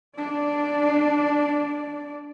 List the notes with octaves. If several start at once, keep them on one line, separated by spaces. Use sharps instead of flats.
D4 D5